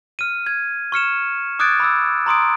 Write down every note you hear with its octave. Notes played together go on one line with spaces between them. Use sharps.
F6 D#7
G#6
C#6 F6 C#7 E7
D6 D#6 F#6 G#6 A6 D7
B5 D6 E6
A#5 C6 D#6 D7